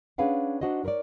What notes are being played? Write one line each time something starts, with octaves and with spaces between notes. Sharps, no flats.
C#4 D4 G#4 B4 F5 F#5
D4 D#4 F#4 C5 D#5
D#4 A#4 B4 C#5 D5